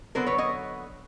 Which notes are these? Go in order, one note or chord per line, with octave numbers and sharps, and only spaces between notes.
D3 F#3 B3 A#4 C5
B4 C#5
C#5 D#5